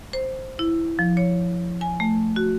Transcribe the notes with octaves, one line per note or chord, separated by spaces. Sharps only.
C5
E4
F3
C#5
G#5
A3
F#4